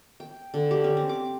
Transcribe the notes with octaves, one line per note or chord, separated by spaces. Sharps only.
G5
D3
G4
C#4
C4
D6